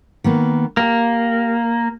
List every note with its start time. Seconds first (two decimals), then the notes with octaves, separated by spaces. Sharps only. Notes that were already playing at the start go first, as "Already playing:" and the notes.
0.24 D#3 A#3 B3
0.77 A#3 G4